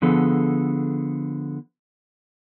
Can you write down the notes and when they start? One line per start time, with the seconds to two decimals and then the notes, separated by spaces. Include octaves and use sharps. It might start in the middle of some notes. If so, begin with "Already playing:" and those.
0.02 D3 F3 B3 G#4 A4